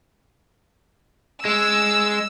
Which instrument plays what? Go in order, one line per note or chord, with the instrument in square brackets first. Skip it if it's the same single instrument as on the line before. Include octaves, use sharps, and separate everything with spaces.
[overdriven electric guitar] G#3 [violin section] E6